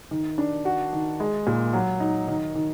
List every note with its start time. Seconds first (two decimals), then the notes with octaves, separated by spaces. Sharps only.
0.11 D#3
0.38 D4
0.65 F#4
0.93 D#3
1.20 G#3
1.47 A#2
1.73 F#3
2.00 D#4
2.28 D#3
2.55 D#3